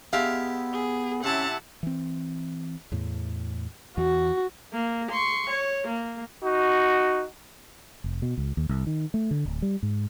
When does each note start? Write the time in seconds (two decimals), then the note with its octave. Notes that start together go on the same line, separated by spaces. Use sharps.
0.13 G#3 B3 G4 E5 F5 A5
0.73 G#4
1.24 C3 C#4 E4 F#5 A5
1.83 E3 C4
2.92 E2 A2
3.97 E2 E3 F#4
4.73 A#3
5.11 C6 C#6
5.50 C#5
5.87 A#3
6.44 D#4 F#4
8.04 F1
8.22 B2
8.38 C#2
8.57 D#2
8.69 C2
8.87 D#3
9.14 A3
9.31 D3
9.45 D1
9.62 G3
9.83 G#2